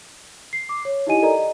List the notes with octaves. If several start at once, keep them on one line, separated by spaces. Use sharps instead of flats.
C7
D6
C#5
D#4 E4 G4 D#5 G#5 D#7
A4 A#4 D5 D#5 A#5
D#5